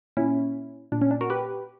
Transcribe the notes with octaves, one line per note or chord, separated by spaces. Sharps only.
A#2 C#4 E4
A#2 D4
C#4
D4
F#4 A#4
G4 B4